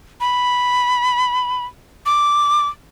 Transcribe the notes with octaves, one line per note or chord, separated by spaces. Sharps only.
B5
D6